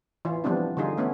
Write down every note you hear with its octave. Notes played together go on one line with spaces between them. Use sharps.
E3 E4 F4
E3 F3 G3 B3 C4 D4
D3 G3 D#4 F4 G#4
A3 B3 C#4 E4